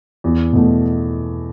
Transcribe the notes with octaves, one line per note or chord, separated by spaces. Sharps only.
E2
B2 A3